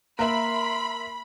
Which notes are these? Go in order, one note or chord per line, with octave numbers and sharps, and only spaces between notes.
A#3 A#4 E5 B5 C6